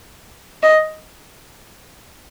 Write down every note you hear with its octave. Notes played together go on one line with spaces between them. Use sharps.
D#5